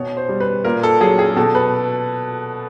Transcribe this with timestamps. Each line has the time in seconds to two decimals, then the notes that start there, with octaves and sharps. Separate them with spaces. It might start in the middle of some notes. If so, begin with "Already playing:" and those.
Already playing: B2 C#5
0.17 C5
0.29 G3
0.40 B4
0.64 A#2 A#4
0.83 A4
1.01 F#3 G#4
1.19 G#4
1.37 B2 A4
1.55 B4